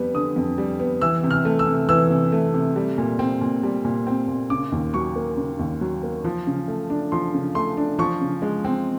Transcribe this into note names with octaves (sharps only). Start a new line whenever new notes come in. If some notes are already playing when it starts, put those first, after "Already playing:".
Already playing: F2 G3 B3
D3 D#6
F2
G3
B3
E3 E6
C3
F6
A3
E6
C3
E3 E6
C3
A3
C3
G3
A#2
C4
A#2
G3
A#2
C4
A#2
C#3 D6
D#2
F#3 C#6
A#3
C#3
D#2
F#3
A#3
F3
C#3
A3
D4
F3 C6
C#3
A3 C6
D4
F3 C#6
C#3
G#3
C4